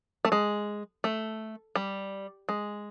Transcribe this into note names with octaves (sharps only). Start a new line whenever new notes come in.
A3
G#3
A3
G3
G#3